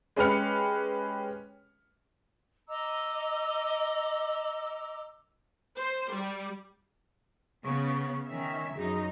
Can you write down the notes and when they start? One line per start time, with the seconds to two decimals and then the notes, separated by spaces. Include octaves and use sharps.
0.16 G#3 C#4 G4 B4 F6 C#7
2.68 D#5 A#5 D6 E6
5.78 C5
6.12 G3
7.65 C#3 B3 C#4 C#6
8.28 D#3 C#4 E5
8.75 F#2 D#4 G#4